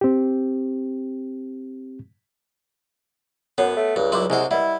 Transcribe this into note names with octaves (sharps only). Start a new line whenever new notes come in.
C4 G4
F#2 B3 C#5 F#5
A3
C#2 G2
F#2 G3 E4 C6 D6
C2 C3 G#3 E4 C5 F#5
G3 E4 B4 D#5 F#5